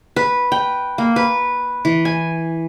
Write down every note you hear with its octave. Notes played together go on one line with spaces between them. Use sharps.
B4
G5
A#3
B4
E3
G#5